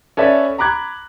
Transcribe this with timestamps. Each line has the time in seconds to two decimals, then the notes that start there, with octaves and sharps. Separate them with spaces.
0.17 C#4 A4 B4 D5 E5
0.58 A#5 B5 D6 F#6 G#6